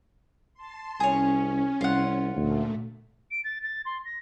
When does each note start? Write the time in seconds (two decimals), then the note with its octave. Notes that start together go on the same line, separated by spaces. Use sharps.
0.54 A5 C6
1.00 C2 C#4 G#4 C#5
1.81 C2 F4 F#5
2.36 D2 A#2 A3
3.31 D7
3.44 A6
3.63 A6
3.85 C6
4.05 A#6